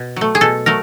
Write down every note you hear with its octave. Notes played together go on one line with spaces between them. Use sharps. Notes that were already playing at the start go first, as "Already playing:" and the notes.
Already playing: B2
F#3 A3
G#4
B2 A4
F#3 A3 A#4